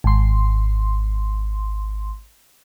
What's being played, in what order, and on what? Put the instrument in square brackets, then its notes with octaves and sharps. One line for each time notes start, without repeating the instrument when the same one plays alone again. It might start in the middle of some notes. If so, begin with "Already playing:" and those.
[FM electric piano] G#1 C6